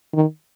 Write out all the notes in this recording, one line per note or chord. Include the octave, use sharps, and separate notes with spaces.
D#3